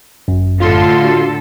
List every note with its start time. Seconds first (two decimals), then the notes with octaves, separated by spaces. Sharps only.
0.28 G1 F#2
0.60 A2 D3 F4 A4 C6
1.04 F#4